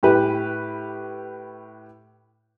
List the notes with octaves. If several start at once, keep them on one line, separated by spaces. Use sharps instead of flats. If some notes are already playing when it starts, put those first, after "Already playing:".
A2 G4 B4